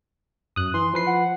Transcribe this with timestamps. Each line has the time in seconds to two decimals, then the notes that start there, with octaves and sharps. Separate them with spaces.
0.56 F#2 D#6 F#6
0.74 E3 C6
0.94 F3 B4 C7
1.07 F#5